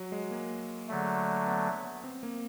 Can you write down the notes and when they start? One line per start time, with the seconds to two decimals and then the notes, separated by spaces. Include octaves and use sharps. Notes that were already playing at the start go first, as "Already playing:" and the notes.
Already playing: F#3
0.12 G#3
0.31 A#3
0.88 D3 F#3 A3
1.47 B3
2.04 C4
2.23 A#3